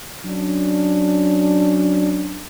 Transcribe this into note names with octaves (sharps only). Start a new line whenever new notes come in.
F#3 C#4 D4